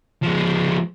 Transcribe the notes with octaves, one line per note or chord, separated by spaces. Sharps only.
F3 G#3